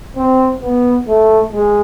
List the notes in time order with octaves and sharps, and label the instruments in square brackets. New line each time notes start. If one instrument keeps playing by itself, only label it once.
[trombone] C4
B3
A3
G#3